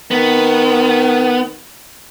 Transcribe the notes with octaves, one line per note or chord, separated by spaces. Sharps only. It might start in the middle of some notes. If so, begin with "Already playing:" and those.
D#3 B3